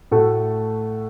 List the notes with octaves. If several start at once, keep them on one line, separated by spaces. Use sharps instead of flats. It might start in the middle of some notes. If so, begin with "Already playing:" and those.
A2 A3 F#4 A4